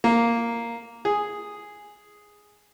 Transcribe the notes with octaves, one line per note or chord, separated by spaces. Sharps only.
A#3
G#4